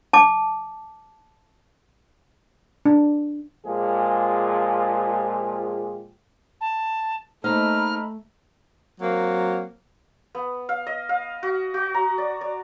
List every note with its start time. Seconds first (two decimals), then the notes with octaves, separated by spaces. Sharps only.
0.13 A5 D6
2.86 D4
3.66 A#2 F3 G#3 F4 G4 G#4
6.61 A5
7.44 A3 A#3 D#4 C5 D#5 A#5 B5 F6
9.01 F#3 A#3 C4
10.35 B3
10.69 F5
10.87 D#5
11.09 F5
11.43 F#4
11.74 F#4
11.94 A#5
12.18 D5
12.41 D5